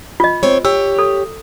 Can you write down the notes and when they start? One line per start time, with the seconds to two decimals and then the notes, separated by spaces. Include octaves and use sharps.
0.20 F4 D#5
0.43 C4 C#5
0.65 G4 C#5 E6
0.99 A4